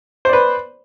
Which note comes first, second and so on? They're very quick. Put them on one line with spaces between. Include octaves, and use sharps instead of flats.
C5 D5 B4